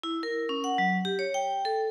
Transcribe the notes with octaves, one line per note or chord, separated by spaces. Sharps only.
E4
A#4
C#4
F#5
F#3
G4
C#5
G5
A4